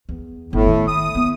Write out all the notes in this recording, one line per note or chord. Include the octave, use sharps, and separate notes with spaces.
E2
G1 A2
D#3
D#6
B3